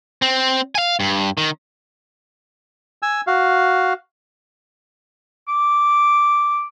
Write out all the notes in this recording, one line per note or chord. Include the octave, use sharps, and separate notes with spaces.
C4
F5 G#5
G2
D#3
G#5 E6
F#4 F5
D6